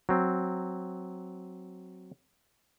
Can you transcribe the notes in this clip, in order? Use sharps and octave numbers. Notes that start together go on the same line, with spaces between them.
F#3 C4